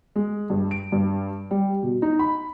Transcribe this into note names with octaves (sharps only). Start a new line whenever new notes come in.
G#3
G2
D7
G2
G3
B2
D#4
B5